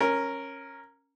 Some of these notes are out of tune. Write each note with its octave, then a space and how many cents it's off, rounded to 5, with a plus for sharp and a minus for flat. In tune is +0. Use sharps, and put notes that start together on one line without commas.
C#4 -15 A#4 +0